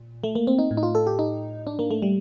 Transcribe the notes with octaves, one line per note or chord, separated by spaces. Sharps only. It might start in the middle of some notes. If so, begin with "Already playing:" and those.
Already playing: A#2
A3
A#3
C4
D#4
A2
D#4
F4
A4
G4
D#4
D4
A#3
A3
G3